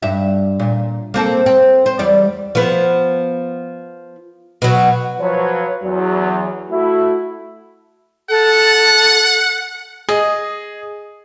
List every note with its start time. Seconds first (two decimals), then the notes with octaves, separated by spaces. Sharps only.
0.02 G2 E5
0.60 A#2
1.14 A#3 C4 A4
1.46 C4
1.86 C5
1.99 E2 G3 D5
2.55 F3 B3
4.62 B2 F#3
5.20 F3 F#3 B4 C#5
5.83 E2 F#3
6.70 A3 E4 F#4
8.30 A4 F#5
10.09 G#4 D#5